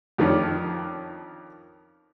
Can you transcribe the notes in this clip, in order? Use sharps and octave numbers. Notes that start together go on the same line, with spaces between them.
F2 D#3 F3 C#4 D4